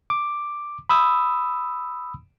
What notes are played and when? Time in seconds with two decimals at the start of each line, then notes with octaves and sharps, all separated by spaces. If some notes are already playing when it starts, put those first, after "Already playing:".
0.10 D6
0.89 B5 D#6 E6